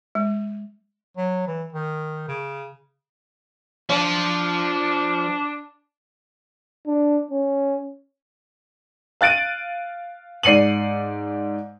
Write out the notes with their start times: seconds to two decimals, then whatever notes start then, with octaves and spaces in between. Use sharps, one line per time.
0.15 G#3
1.17 F#3
1.47 E3
1.73 D#3
2.28 C#3
3.90 F3 D4
6.87 D4
7.31 C#4
9.21 F5 F#6 A6 D7 D#7
10.43 G#2 D5 C7 C#7 D#7 F#7